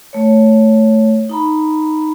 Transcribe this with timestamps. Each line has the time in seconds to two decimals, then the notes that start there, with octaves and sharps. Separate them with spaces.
0.13 A3 C#5
1.29 D#4 A#5 B5